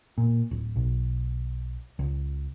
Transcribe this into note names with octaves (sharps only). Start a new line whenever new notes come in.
A#2
D1
B1
C#2